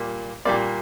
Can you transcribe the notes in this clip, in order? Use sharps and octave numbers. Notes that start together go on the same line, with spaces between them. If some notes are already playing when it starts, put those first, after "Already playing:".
Already playing: A#2 G3 A#3
A#2 G3 A#3 D5